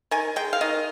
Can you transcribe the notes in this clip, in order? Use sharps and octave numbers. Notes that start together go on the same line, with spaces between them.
D#3 G#5
G#3 G5
F5
D#3 D#5